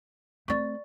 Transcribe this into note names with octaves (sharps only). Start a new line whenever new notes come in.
A3 C4 D5 C#6